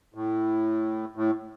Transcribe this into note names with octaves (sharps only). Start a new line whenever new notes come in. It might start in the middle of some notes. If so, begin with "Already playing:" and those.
A2
A2